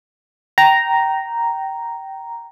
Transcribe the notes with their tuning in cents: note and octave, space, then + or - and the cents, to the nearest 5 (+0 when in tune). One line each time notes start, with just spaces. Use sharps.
G5 -20 A#5 +0